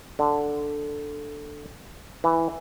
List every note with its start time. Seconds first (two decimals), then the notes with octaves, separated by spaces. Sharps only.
0.19 D3
2.24 E3